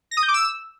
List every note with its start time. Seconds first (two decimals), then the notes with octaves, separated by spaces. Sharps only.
0.11 A#6
0.17 D#6
0.23 G6
0.28 D6
0.34 E6